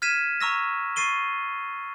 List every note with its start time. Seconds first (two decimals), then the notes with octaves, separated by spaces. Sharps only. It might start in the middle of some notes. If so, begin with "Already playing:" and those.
0.02 F6 G#6 B6 D#7 E7
0.41 A#5 C#6 E6 A#6
0.96 C#6 A6 C7 D#7 G7